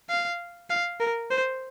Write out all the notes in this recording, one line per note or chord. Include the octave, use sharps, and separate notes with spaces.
F5
F5
A#4
C5